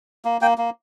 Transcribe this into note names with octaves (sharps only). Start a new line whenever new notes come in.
A#3
A#3 G5
A#3